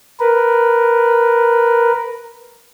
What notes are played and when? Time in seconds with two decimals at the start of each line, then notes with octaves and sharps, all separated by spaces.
0.20 A#4 B4